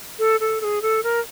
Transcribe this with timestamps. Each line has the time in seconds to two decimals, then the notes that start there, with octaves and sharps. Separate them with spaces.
0.19 A4
0.40 A4
0.61 A4
0.64 G#4
0.82 A4
1.03 A#4